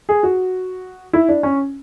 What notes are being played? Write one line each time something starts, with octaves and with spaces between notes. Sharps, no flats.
G#4
F#4
E4
D4
C#4